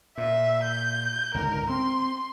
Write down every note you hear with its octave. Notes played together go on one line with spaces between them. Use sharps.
A#2 E5
G6
C#2 G#2 D3 A#4
C4 C6